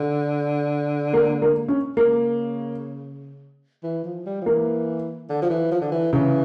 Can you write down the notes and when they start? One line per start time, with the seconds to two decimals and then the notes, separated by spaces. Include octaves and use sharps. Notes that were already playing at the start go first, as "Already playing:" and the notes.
Already playing: D3
1.13 A#3
1.42 A#3
1.68 C#4
1.97 C#3 A#3
3.83 E3
4.05 F3
4.26 G3
4.42 F3
4.46 E3 A#3
5.30 D3
5.42 F3
5.50 E3
5.71 F3
5.81 D3
5.92 E3
6.13 C#3 E3